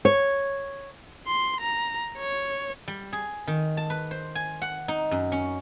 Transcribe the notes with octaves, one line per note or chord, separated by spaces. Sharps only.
C#5
C6
A#5
C#5
G3
G#4
D#3
A5
B4
C5
G#5
F#5
D#4
F#2
C#4